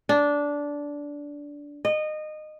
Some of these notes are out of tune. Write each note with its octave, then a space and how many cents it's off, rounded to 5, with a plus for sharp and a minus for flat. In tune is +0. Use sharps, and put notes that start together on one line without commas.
D4 -15
D#5 -20